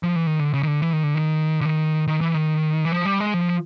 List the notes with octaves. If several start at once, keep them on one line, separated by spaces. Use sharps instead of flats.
F3
E3
D#3
D3
C#3
D#3
D3
E3
D#3
D3
D#3
D3
D#3
D#3
E3
D#3
E3
F3
G3
G#3
F3